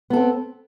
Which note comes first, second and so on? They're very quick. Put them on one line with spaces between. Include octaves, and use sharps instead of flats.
B3 A4 C4